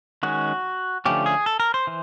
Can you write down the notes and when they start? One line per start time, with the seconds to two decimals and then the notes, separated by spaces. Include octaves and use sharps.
0.23 D#3 G#3 C#4 F#4
1.06 D3 F3 A3 C#4 G4
1.26 G#4
1.46 A4
1.60 A#4
1.74 C5
1.87 E3